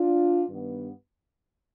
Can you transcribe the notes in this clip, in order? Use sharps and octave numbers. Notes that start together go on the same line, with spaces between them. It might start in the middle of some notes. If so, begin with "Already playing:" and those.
Already playing: D4 F4
G2 D#3 B3